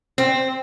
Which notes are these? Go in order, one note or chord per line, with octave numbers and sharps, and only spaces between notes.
C4